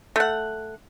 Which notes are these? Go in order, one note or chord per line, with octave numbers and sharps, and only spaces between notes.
A3 F#5